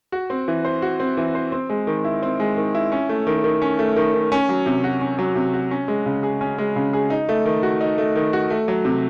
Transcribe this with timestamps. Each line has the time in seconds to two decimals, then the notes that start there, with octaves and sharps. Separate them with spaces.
0.12 F#4
0.30 C4
0.48 E3
0.65 C5
0.82 F#4
1.00 C4
1.17 E3
1.35 C5
1.52 C4
1.70 G#3
1.87 D#3
2.04 E4
2.23 C4
2.40 G#3
2.57 D#3
2.75 E4
2.92 C#4
3.09 A3
3.27 D#3
3.44 D#3
3.62 C#4
3.79 A3
3.96 D#3
4.14 D#3
4.32 C#4
4.49 F#3
4.66 C3
4.84 F#4
5.01 C#4
5.19 F#3
5.36 C3
5.54 F#4
5.71 C#4
5.88 G#3
6.06 C#3
6.23 G#4
6.41 C#4
6.58 G#3
6.76 C#3
6.93 G#4
7.10 D#4
7.29 A3
7.45 D#3
7.63 F#4
7.81 D#4
7.98 A3
8.15 D#3
8.33 F#4
8.50 A3
8.68 F#3
8.85 C3